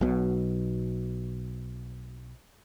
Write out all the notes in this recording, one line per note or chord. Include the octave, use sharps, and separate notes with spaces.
B1 B2 F#3